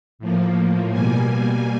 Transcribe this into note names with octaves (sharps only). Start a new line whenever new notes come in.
A2 F3 A#3
B2 G3 A#3 G#5